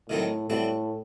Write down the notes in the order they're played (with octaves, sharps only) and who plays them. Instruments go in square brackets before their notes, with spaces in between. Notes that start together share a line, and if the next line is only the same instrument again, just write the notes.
[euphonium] A2 [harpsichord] D#3 F#3 A3 C4 D#4
[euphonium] A2 [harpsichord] E3 G3 C4 F#4